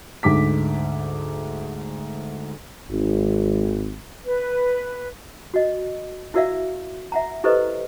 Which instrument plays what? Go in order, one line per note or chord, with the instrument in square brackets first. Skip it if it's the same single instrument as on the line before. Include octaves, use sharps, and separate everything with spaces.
[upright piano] D2 G#2 D6 B6
[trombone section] G#1
[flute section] B4
[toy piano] F#4 D#5
E4 F#4 A#4 D5 E5 F5
E5 F#5 A#5
E4 G4 A4 B4 C5 D#5